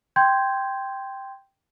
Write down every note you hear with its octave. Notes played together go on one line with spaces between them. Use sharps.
G5 C6 G6 G#6